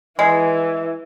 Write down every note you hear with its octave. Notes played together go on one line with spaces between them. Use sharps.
E3 G#3